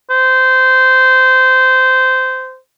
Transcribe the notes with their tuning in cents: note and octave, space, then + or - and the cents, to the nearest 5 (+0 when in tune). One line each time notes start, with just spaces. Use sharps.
C5 -15